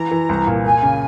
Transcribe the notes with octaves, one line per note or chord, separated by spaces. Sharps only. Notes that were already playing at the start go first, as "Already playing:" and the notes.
Already playing: E3 A#5
E3
C2
A#2
A#3 G#5
C#3